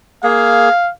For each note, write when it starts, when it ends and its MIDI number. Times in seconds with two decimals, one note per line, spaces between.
0.24 0.69 58
0.24 0.69 68
0.24 0.90 77